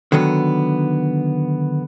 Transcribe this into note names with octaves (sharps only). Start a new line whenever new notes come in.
D3 D#3 F#3 B3